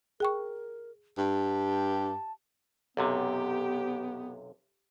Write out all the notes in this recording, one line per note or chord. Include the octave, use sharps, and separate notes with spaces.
G#4 A#4 G5 C#6
G2 G4 A5
B1 F#2 C3 B3 G4